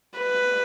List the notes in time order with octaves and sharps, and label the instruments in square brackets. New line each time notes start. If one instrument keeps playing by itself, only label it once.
[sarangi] B4